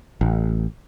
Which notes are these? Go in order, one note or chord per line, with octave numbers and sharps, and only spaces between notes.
A1